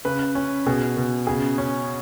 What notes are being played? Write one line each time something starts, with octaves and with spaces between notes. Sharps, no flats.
C#3 B4
C#4
B2 G#4
B2
C#3 G#4
C#4